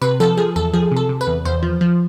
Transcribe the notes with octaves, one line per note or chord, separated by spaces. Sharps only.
C3 B4
F3 A4
F3 G#4
E2 A4
F3 G#4
C3
A4
C3
B4
E2
E2 C5
F3
F3